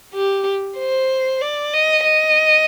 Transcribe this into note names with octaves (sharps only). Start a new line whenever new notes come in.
G4
C5
D5
D#5
D#5